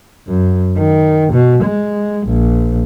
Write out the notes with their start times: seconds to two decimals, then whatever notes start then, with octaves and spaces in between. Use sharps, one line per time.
0.27 F#2
0.77 D#3
1.33 B2
1.64 G#3
2.27 A#1